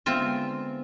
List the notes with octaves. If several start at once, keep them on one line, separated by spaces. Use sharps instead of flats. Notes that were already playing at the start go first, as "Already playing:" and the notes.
D3 G#3 B3 C4 F4 E5